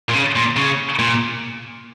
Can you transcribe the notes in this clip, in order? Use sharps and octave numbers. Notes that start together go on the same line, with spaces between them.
A#2
C#3
A#2
C#3
A#2